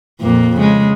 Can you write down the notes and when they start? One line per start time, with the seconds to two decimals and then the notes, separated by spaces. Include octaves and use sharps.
0.21 F2 A#2 A#3
0.58 C#3 G#3